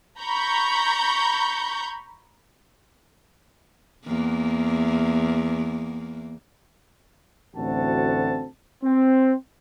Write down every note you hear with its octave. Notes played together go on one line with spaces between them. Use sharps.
A#5 B5 C#6 G6
E2 A#3
A1 D2 C4 F#4 A4 A5
C4